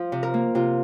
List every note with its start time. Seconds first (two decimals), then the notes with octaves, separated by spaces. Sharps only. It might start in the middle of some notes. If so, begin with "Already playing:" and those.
Already playing: F3
0.12 C3
0.23 A#4
0.34 A#3
0.55 C3 F4